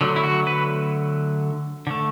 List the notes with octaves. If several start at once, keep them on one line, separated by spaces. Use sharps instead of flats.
D3 F#3 A3
E4
F#4
B4
D3 A3